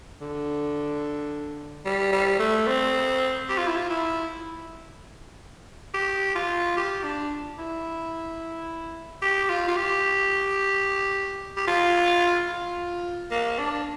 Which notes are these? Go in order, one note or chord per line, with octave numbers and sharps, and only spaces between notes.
D3
G3
G3
A3
C4
G4
F4
E4
F4
E4
G4
F4
G4
D4
E4
G4
F4
F4
G4
G4
F4
F4
A#3
D4